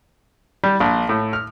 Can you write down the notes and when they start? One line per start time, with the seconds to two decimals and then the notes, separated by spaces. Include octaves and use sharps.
0.64 G3
0.80 A#1
1.09 A2
1.33 F6